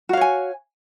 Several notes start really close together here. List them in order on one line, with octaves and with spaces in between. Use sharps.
F#4 F5 C#5 G#5